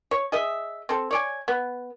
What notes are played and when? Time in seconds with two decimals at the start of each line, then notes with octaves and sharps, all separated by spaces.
0.11 C#5
0.32 G#4 D#5 E5
0.89 C4 A4
1.11 C#5 D5 G#5
1.48 B3